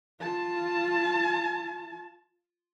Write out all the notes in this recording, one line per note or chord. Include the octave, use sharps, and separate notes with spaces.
F4 A5